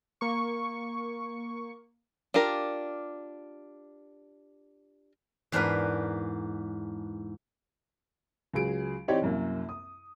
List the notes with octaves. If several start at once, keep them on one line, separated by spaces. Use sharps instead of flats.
A#3 C#6
D4 F4 G4 A#4
E2 G#2 D4 A#4 B4
C#2 F#3 G#4 D7
E3 C4 D#4 G4 C#5 D5
C2 F#2 A#3
D#6